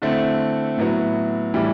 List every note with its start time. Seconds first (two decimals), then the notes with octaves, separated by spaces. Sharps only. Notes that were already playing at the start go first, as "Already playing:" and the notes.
0.02 D3 A3 C4 E4
0.78 A2 F#3 B3 E4
1.54 A2 E3 G3